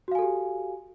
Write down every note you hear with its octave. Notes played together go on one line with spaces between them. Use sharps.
F#4 G4 A4 F5 G#5